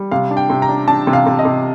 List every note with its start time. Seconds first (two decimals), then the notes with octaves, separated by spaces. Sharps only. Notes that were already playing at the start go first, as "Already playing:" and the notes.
Already playing: G3
0.11 C3 F5
0.31 D4
0.37 G5
0.50 C3
0.62 A#5
0.69 D4
0.88 D4 A5
1.07 C3
1.13 F5
1.27 C3
1.39 D#5
1.45 C3